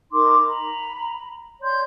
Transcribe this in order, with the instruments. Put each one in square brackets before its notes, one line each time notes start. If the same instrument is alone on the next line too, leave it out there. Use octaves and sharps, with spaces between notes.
[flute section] D#4 A#4 C6 D6
A#5 B5
C#5 D5 C6 G6